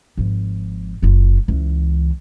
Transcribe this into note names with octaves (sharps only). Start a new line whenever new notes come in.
G#1 F3
F#1 F4
C#2 E3